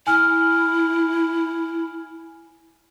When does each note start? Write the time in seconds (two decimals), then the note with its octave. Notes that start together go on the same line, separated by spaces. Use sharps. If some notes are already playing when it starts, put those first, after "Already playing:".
0.07 E4 G#5 F6